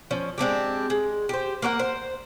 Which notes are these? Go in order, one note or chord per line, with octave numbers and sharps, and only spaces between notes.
F3 C#4
G#3 C4 D4 G4
G#3
G4 C5
A#3 A#4 C#5 F#5
C5